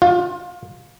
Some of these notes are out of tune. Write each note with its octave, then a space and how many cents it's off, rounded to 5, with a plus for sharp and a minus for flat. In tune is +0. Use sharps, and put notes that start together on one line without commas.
F4 +25